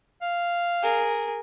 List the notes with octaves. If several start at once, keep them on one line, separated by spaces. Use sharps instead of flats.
F5
G#4 A#4